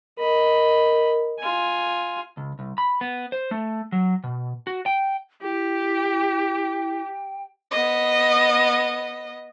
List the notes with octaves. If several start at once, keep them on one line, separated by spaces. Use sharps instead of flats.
A#4 D#5 B5
F4 G#5
C#2
C2
B5
B3
C5
A3
F#3
B2
F#4
G5
E4 G4 G5
B3 D#5